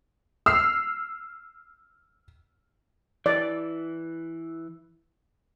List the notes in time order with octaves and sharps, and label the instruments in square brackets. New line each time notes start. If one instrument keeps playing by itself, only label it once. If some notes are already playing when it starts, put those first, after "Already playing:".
[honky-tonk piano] E6 F6 C7
[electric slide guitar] E3 [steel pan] D5